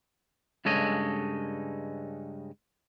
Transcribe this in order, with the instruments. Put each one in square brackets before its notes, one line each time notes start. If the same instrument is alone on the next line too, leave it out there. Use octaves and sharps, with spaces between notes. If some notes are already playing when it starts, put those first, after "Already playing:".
[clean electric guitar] G2 C#3 G#3 A4 C#5 D#5